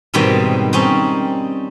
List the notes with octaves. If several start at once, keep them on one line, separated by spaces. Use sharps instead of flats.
G#2 B2 D#3 G3 B3 C4
G3 C4 C#4 D#4